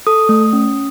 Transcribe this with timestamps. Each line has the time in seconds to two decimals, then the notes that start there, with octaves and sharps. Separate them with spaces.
0.07 A4 D#6
0.29 A3
0.53 C#4